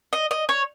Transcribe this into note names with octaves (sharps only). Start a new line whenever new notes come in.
D#5
D#5
C#5